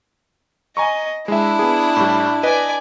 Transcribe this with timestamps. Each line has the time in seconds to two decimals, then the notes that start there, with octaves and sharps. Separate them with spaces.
0.77 D#5 G#5 A#5 C#6
1.28 G#3 D4 E4 E5
1.59 B3 G#4
1.97 A2 G3
2.43 B4 D5 D#5 G#5